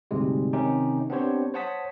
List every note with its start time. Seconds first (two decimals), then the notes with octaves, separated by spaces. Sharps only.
0.11 D2 G#2 C3 G3 G#3
0.53 C3 D#3 C#4 D#4 G4
1.10 B3 C4 D4 G4 C5 C#5
1.54 C5 C#5 F#5 A5 D#6 B6